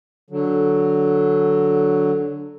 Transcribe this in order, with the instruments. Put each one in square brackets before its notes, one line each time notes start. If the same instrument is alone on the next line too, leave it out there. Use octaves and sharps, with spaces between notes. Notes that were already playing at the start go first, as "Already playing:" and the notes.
[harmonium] D3 F#3